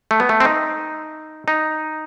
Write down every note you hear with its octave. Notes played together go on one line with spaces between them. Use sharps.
A3
B3
A3
C4
D#4
D#4